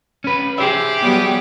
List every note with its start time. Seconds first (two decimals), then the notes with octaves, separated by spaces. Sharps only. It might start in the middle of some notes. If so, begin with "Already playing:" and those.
0.24 C#4 B4
0.58 G4 G#4 C5 E5
1.01 F#3 G3 B3